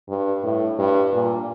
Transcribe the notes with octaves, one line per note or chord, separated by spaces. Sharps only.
G2
A2
G2
A#2